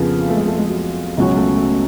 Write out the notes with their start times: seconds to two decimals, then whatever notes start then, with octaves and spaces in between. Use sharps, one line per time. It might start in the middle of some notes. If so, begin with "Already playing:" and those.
Already playing: F2 C#3 F3 B3 F4 G#4
0.29 A3
0.37 G#3
0.47 A3
0.58 G#3
0.67 F#3
1.17 C#2 B2 F#3 G#3 C#4 F#4
1.37 A3
1.57 A3